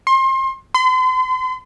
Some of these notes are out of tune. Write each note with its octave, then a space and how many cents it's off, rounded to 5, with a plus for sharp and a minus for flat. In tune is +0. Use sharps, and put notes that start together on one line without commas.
C6 +30
C6 -40